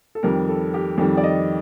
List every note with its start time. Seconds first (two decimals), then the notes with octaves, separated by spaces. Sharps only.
0.15 A4
0.23 F2 D#3 G3 A#4
0.48 A4
0.74 G4
0.98 F2 D#3 G3 A4
1.17 D5
1.24 D#5